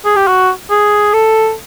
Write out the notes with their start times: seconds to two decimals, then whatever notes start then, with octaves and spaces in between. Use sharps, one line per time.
0.05 G#4
0.16 G4
0.28 F#4
0.70 G#4
1.14 A4